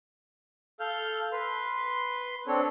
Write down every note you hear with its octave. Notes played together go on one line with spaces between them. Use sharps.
A4 F5 F6 G6
B4 C6
C4 D4 A4 C#5